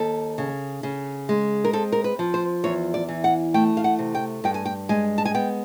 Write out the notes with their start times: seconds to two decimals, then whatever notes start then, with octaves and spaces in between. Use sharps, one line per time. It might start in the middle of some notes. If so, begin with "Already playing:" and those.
Already playing: D#2 A4
0.38 C#3
0.83 C#3
1.29 G#3
1.65 A#4
1.73 C4 A4
1.92 A#4
2.04 B4
2.19 F3
2.34 C5
2.64 E2 C#5
2.94 D5
3.09 E3
3.24 F#5
3.54 A3 G5
3.77 F5
3.84 F#5
3.99 C3
4.15 G5
4.44 G2 G5
4.54 G#5
4.65 G5
4.89 G#3 G#5
5.18 A5
5.25 G#5
5.34 B3 G5